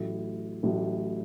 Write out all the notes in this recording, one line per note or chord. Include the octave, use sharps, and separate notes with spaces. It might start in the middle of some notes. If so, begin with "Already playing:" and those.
Already playing: A1 A2 F#3
A1 A2 F#3